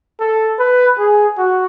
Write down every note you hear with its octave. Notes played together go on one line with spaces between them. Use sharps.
A4
B4
G#4
F#4